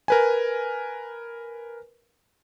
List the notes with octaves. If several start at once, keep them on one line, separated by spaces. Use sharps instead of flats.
A#4 B4 G#5